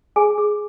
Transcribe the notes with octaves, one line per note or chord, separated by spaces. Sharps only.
G#4 G#5
G#4